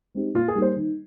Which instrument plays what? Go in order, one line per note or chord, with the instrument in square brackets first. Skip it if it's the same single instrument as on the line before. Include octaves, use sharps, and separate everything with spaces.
[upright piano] G#3 C4 D#4 G4
[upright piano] A#2 [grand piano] F4
[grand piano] G#4
[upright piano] G3 A#3 D#4 G4
[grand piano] C5
[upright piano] D#3